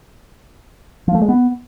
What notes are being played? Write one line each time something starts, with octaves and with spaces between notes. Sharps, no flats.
F3
A3
G#3
B3